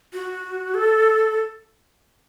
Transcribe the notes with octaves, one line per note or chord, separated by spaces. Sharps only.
F#4
A4